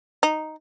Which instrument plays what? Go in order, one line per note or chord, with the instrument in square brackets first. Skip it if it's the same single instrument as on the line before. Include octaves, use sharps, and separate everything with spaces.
[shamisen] D#4